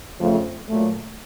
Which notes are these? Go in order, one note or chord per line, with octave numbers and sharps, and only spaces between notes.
F2 C#3 F3 A3
A#2 F#3 A3